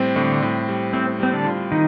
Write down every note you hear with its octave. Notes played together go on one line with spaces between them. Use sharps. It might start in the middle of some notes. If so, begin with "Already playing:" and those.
Already playing: A2 G3 C4
A2 D3 D4
A2
G3
A2 C4
G3 C4
D3 D4
F4
D#3 D#4